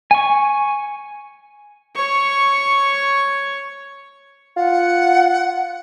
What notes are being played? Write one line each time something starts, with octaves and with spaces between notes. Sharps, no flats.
G#5 C#6
C#5 C#6
F4 F#5